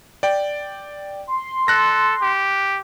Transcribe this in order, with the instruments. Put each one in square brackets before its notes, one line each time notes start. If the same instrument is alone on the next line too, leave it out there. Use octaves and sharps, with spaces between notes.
[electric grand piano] D5 G5
[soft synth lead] C6
[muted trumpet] A4 [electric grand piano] F#6 A#6
[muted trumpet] G4